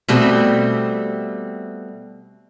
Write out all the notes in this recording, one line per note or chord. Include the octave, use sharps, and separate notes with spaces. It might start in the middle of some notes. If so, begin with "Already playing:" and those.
B2 G3 A3 C4